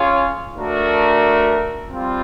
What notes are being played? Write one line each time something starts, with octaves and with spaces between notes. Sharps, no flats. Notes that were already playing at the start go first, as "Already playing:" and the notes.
Already playing: C#4 F4 G#4 C#5 F5
A3 D4 F#4 A#4
G3 C4 F4